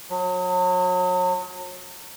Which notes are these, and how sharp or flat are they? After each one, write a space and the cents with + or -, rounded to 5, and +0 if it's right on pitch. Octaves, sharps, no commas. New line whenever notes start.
F#3 -35